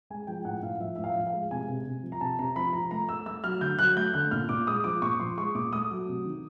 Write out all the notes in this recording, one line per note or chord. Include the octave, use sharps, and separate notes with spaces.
G#3 G#5
F3 G5
A2 F#5
A2 F5
F3 E5
A2 E5
F5
F3
F5
G#3
C3 G#5
C3
C3
F3
A#5
C3 A5
C3 A#5
F3 B5
F3 A#5
A3 A#5
A3 E6
A3 E6
F#3 F6
D3 G6
F#3 F#6
A3 G6
D3 F#6
A#2 F6
A#2 D6
G#3 D#6
F3 D6
A#2 C#6
F3 C6
G#3 C#6
A#2 D6
A3 D#6
F#3
C3
D#3